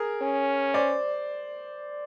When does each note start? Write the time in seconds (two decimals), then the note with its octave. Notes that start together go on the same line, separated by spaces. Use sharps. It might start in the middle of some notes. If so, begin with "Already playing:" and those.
Already playing: G#4 A#4
0.22 C#4
0.74 C5 D5